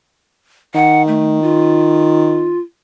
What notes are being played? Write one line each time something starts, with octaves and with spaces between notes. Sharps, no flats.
D#3 F#5
A3
F4